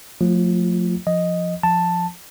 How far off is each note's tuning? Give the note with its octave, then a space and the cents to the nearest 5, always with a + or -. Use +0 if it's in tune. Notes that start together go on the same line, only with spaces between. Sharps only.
F3 +40 A3 +25 F4 -15
F3 +0 D#5 +0
F3 +0 A5 +5